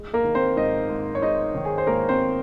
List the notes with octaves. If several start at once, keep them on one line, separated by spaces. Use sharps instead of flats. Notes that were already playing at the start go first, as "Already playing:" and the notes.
Already playing: G#3
A#3 A#4
D#3
C4 C5
G#2 D#4 D#5
G#2
C#5
G#3 D#4 D#5
D#3
G#4
C5
G#2 A#3 A#4
C4 C5